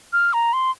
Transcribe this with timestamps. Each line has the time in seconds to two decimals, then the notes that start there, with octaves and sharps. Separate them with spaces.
0.13 F6
0.33 A#5
0.53 C6